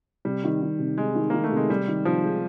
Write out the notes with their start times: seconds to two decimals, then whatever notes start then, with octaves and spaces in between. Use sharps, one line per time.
0.25 C3 G3
0.44 D#3
0.62 D#3
0.79 C3
0.97 C3 G#3
1.15 D#3
1.30 D#3 A#3
1.44 A3
1.52 C3 G#3
1.69 C3 G3
1.88 D#3
2.05 C3 F3
2.24 G#3